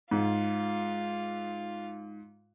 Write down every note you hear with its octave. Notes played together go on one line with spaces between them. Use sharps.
G#2 F4